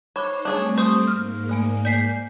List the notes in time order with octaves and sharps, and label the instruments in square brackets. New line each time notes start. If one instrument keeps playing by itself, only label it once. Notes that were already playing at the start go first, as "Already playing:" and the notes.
[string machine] D#4 C5 C7 [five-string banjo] C#5 [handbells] B5 D6 F#6
[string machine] G3 A3 C4 [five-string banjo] D4 G#4 C#5
[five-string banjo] C5 [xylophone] C#6 D#6 G6
[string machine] G#2 A#3 [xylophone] F6
[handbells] A3 G#5 D7
[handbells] D5 G#5 [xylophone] G6 B6 C7